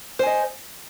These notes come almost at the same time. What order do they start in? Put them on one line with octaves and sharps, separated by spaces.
C5 G#5 D#5